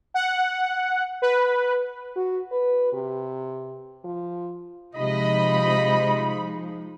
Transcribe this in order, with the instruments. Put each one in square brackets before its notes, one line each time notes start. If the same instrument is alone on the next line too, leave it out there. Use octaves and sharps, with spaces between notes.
[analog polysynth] F#5
B4
[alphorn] F#4
B4
C3
F3
[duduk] C3 [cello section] F3 G#3 D#4 [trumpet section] D#5 [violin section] B5